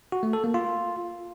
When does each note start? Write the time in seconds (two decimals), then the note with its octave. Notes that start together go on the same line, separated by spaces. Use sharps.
0.12 F#4
0.23 A3
0.33 A4
0.44 A#3
0.54 F4